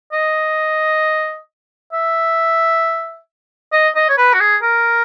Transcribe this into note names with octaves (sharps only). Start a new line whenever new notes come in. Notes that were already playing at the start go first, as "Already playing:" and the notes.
D#5
E5
D#5
D#5
C#5
B4
F#4
G#4
A#4